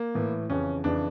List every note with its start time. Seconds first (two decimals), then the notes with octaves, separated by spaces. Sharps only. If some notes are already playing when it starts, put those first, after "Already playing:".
Already playing: A#3
0.15 A2 E3
0.50 F2 C#3 E3 C#4
0.84 F2 C#3 E3 D4